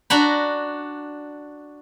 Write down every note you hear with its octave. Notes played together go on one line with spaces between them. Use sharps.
D4 F#4 A#5 B5